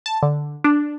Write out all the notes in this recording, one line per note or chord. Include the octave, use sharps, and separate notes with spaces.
A5
D3
D4